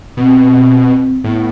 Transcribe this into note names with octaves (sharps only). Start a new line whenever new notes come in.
B2 C4
A2 B3